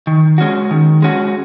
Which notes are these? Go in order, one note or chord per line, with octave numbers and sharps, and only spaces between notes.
D#3
G#3 C#4 F#4
D#3
G#3 C#4 F#4